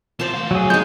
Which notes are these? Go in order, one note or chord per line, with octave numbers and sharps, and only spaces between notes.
E3 F4 C5 A5
A3 F5
F#3 G#4
G#3 D#4 G6